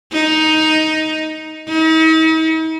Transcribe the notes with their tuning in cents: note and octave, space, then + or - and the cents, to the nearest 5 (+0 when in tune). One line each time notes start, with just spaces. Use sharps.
D#4 +10
D#4 +45